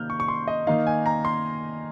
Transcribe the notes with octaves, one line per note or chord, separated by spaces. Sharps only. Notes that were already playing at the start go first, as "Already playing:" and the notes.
Already playing: C3 D#3 A#3 F6 G6
C#6
C#6
C6
D#5
D#3 A#3 D#4 F5
G#5
A#5
C6